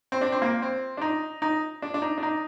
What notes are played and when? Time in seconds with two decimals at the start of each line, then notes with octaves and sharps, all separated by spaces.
0.12 C4
0.21 D4
0.32 C4
0.42 A#3
0.62 C4
0.97 D4
1.01 D#4
1.42 D#4
1.82 D4
1.94 D4
2.02 D#4
2.18 D4
2.23 D#4